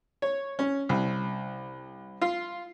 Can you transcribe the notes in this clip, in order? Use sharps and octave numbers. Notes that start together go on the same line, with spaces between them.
C#5
C#4
C2
F4